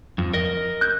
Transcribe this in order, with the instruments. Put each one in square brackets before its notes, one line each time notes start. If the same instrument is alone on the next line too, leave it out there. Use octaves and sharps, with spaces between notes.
[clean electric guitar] F2
A#4 D#5
[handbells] F#6 G6